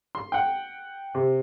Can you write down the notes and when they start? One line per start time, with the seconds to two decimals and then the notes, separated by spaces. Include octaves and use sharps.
0.15 C6
0.32 F#5 G5
1.15 C3